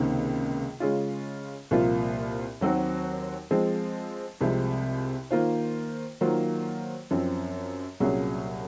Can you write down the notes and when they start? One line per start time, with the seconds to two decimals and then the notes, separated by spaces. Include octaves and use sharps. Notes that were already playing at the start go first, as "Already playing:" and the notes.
Already playing: C#2 C3 D#3 A#3
0.80 C#3 G#3 C#4 F4
1.71 C2 A#2 F3 A#3 F4
2.61 D#2 D#3 F#3 C4 F#4
3.51 F3 G#3 C4
4.41 C2 C3 F3 G#3
5.31 D#3 A#3 F4 C5
6.21 D#3 F#3 A#3 F4 C5
7.11 F#2 F3 C4
8.00 C2 A#2 F#3 C#4 G#4